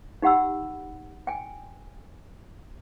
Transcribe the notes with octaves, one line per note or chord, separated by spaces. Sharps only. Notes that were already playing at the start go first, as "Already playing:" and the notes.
D#4 G4 F#5 B5 E6
G5 G#5